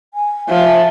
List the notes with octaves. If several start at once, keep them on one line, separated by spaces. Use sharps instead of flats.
G#5
F3 E5